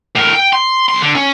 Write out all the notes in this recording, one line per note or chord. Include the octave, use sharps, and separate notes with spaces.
A2 A#4
G5
C6
B1 C6
D3
C#4